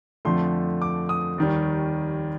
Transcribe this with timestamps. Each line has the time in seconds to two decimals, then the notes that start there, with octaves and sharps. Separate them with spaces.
0.25 F2 D3 F3 A3 C6
0.82 D6
1.09 D#6
1.38 D#2 D#3 G3